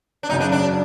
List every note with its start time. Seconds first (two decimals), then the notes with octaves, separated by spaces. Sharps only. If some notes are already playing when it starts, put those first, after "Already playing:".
0.23 D4
0.29 F#2 C#3 F#3 D#4
0.41 D4
0.52 D4